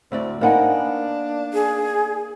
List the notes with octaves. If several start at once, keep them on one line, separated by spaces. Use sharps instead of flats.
D2 C4 E4 F#4 D5
A#3 B3 D4 D#4 C5 F#5 G#5
G#4